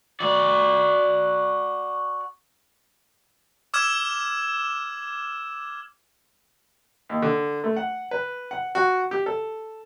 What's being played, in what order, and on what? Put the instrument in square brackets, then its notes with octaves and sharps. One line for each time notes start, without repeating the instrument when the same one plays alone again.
[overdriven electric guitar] F#4 D5
[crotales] D6 E6 F6 G#6 E7
[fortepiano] D#2
D3
A3
F#5
B4
F#5
F#4
G4
A4